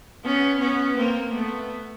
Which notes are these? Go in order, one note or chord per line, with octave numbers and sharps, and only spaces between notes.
B3 C#4
B3 C#4
A#3 C4
A3 B3